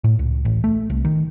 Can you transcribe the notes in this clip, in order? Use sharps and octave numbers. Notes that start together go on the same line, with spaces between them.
A2
C#2
A1
A3
C2
D#3